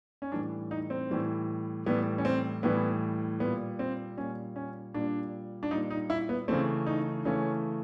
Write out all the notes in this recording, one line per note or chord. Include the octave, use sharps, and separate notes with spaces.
C#4
A2 E3 G3 D4
D#4
C4
A2 E3 G3
A2 E3 G3 B3
C#4
C4
A2 E3 G3 B3
A#2 G3 B3
C4
A#2 G3 C#4
C#4
A#2 G3 D4
D4
A#2 G3 D#4
D#4
E4
B3
C#3 E3 A3 C4
D#4
C#3 E3 A3 C#4